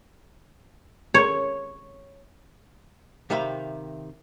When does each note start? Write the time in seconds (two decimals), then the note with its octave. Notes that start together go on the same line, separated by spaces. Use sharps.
1.14 C#5
3.30 C3 D#3 G4 E5 F5 B5